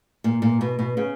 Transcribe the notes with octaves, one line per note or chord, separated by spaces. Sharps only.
A#2
A#2
B2
B2
C#3